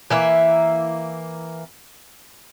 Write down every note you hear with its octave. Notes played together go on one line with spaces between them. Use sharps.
E3 A#3 E5